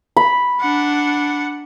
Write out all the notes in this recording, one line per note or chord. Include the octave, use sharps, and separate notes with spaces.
B5
D4 F#5